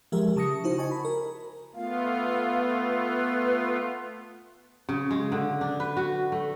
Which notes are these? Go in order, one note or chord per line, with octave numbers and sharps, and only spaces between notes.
F3 G#3 G4 A#4 E5
C#3 A5 D#6 A#6 C#7
D#4 E4 F#4 C5
D#5 G#5 A5 C#6
B5
A#4
A3 B3 F4 F5
B4
C#3
G#3
D3
D4
B4
F#4
A3